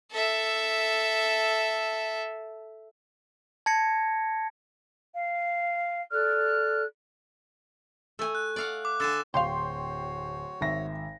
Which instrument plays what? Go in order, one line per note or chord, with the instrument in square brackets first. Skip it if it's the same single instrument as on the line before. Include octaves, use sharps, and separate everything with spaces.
[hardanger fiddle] A4 E5
[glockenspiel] A5 G#6 A#6 C#7
[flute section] F5
A4 D5 F6 F#6
[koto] A3 G#5
[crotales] F#6
[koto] D5 F5 F#5
[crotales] D6
[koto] D3 G#5 [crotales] E6 A6 E7
[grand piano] D1 [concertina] F#4 C#5 [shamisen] C5 F5 [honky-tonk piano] G5 C6
[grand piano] G#1 E5 A#6